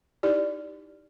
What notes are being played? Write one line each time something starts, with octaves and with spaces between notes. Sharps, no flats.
D#4 E4 G4 D5